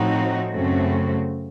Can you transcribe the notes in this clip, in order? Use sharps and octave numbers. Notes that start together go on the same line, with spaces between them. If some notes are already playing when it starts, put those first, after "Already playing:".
Already playing: A2 F3 C4 D#4 F#4
F#2 C#3 A3 C4 F#4